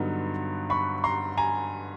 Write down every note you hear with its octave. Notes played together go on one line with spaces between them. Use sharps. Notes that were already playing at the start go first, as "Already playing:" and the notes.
Already playing: G2 D3 F#3 B3 D#4
B5 C#6
A#5 C6
G#5 A#5